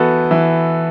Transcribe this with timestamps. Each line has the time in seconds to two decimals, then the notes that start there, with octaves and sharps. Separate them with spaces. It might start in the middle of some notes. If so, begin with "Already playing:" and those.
Already playing: E3 B3 F#4 A4
0.31 E3